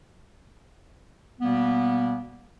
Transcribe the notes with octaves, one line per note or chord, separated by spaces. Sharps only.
B2 G3 A#3 B3